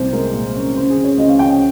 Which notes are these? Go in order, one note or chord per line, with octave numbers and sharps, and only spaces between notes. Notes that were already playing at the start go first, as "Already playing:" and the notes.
Already playing: C2 C3 C5
G#3 A#4
A#2
C#4
C#3 C5
G#4
C#3
C#5
C#2 D#5
F5
C#2 G5
G5